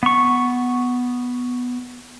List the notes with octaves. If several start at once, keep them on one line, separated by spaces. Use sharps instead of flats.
B3 C#6